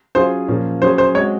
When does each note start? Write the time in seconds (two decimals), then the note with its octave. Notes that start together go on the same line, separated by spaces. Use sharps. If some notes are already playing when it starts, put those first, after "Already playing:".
0.15 F#3 C#4 F4 G#4 C5
0.48 A#2 F3 A#3 C#4
0.82 F#3 C#4 G#4 C5
0.98 C5
1.15 G#3 C4 F#4 C#5